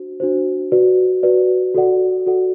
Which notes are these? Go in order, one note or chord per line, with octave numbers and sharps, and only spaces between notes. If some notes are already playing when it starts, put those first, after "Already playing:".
Already playing: D4 F#4 C5
D4 F#4 C5
F#4 B4 D5
F#4 B4 D5
F#4 A4 D5 F#5
F#4 A4 D5 F#5